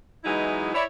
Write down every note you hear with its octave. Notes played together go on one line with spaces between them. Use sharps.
E3 F#3 G#3 B3 D#4 E4
E4 C#5 D5